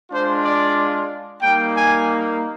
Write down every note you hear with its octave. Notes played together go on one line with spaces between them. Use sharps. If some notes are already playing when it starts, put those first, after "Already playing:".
G#3 D4 F4 C5
D5
G3 A#3 D#4 G5
G#5